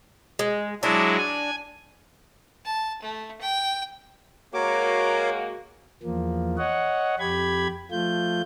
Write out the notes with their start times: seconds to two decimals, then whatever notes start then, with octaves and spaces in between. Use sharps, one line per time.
0.39 G#3
0.83 F#3 G#3 D4 E4
1.18 G#5
2.65 A5
3.02 A3
3.41 G5
4.54 G#3 A#3 F#4 A#4 C#5 D6
6.03 E2 F3 A#3
6.58 C#5 D#5 F#5
7.19 F2 G4 B5 G#6
7.91 F3 A3 F4 G6